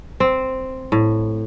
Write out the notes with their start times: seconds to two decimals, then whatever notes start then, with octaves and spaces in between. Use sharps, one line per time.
0.20 C4
0.92 A2